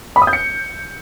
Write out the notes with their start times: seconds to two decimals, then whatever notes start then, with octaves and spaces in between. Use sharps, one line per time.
0.16 B5
0.22 D#6
0.27 G6
0.33 C#7